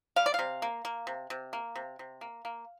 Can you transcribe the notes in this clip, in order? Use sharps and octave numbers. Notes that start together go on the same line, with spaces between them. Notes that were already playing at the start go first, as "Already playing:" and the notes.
G3 F5
D5
C3 F5
A#3
A#3
C3
C3
A#3
C3
C3
A#3
A#3